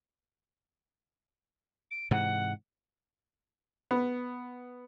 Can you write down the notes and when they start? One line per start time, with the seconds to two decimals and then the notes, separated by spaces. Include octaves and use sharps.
1.91 D7
2.11 G#2 C3 E3 F#5
3.91 B3